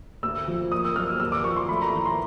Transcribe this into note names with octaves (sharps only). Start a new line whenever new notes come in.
D2 E6
F3
A#3 D#6
E6
F#3 F6
E6
D#2 E6
D6
F3 C#6
C6
A3 B5
A#5
E3
C6